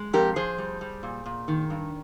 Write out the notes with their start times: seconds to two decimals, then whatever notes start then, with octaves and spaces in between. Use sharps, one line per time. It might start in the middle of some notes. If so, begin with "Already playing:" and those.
Already playing: G#3
0.13 F2 G4 A#4
0.36 F3 G#4 C5
0.58 G3
0.81 G3
1.03 A#2
1.26 A#2
1.48 D#3
1.70 G2